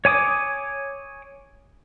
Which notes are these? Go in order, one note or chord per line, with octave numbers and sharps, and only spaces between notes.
C#5 G#5 D6 D#6